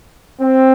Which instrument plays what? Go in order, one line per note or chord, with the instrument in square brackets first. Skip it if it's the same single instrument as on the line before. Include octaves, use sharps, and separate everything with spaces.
[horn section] C4